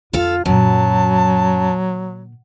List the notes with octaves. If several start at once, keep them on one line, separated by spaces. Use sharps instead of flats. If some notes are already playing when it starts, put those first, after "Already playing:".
F2 D3 F4 A4 F5
F#2 A#2 D3 F#3 A5